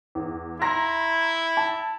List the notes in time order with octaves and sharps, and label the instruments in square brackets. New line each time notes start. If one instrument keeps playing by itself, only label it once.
[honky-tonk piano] E2
[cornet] E4 [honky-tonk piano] A#5 C6 A#6
[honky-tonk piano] A5